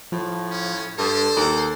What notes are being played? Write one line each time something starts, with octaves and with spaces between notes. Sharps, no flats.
A2 F3
C#4
G2 A4 C5
D#2